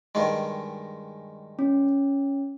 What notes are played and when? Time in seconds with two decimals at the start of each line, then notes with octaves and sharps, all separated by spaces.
0.15 G2 D#3 G#3
1.59 C#4